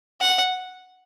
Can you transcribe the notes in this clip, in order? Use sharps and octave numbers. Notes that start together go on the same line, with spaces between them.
F#5